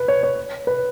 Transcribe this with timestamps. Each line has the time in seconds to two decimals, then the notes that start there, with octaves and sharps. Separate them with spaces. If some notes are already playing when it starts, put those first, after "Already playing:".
Already playing: B4
0.08 C#5
0.23 C#5
0.67 B4